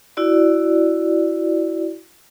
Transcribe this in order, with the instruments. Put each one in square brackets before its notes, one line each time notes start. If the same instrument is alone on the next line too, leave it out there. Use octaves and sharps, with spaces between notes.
[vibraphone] E4 F#4 D5